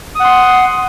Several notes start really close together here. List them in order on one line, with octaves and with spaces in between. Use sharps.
D#6 F#5 C6